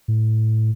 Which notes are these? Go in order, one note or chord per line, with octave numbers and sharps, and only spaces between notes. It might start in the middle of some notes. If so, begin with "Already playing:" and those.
A2